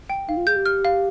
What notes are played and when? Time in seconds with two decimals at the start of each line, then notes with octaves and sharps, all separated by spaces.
0.10 G5
0.28 D#4 F5
0.37 F4
0.47 G#4 G6
0.56 G4
0.66 F6
0.85 F5